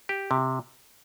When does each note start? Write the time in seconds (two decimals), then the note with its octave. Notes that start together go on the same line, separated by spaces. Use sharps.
0.09 G4
0.31 C3